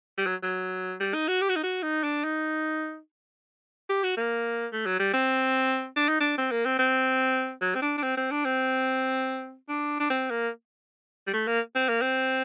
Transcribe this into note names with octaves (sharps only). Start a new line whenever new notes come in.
G3
F#3
F#3
G3
D#4
F#4
G4
F#4
D#4
F#4
D#4
D4
D#4
G4
F#4
A#3
A3
F#3
G3
C4
D4
D#4
D4
C4
A#3
C4
C4
F#3
C4
D4
D4
C4
C4
D4
C4
D4
D4
C4
A#3
G3
A3
A#3
C4
A#3
C4